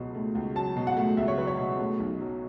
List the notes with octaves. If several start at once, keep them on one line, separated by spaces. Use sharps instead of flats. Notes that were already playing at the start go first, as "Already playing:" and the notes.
Already playing: C#2 B2 F#3
A3
C#2
F#3 A5
B2
F#5
A3
C#2 E5
C#5
F#3 B4
C#5
B2
A3
B1
F#3